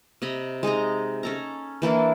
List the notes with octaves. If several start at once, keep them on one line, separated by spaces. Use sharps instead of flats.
C3 D#5 A#5 B5
G#3 D#4 D#5 A#5
C#4 A4 A#5
E3 A#3 D4 E4